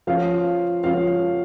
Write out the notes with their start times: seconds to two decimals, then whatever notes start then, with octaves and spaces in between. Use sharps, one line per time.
0.07 F3 C#4 F4 F5
0.83 F3 C#4 F4 F5